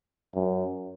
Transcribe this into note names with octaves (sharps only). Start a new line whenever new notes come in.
F#2